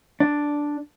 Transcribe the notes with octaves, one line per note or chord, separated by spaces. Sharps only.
D4